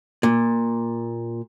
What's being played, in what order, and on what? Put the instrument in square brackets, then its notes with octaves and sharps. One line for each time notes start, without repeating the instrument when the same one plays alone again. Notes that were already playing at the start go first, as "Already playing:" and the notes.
[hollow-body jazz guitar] A#2